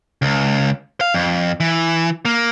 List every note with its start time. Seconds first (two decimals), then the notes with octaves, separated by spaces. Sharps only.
0.22 C#2
1.01 F5
1.14 F2
1.60 E3
2.25 A#3